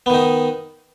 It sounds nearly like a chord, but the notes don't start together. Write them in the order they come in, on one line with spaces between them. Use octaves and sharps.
B3 D#3 D#4